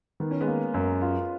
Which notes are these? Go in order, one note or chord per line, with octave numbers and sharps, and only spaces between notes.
D#3 B3
C#4
G#3 B3
A#3
F#2
F4